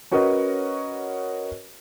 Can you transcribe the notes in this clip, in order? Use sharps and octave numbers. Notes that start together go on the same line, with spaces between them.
C#4 F#4 A#4 B4 C#5 D#5